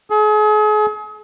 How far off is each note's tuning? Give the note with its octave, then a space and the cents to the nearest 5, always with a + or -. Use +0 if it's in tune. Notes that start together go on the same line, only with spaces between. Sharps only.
G#4 +40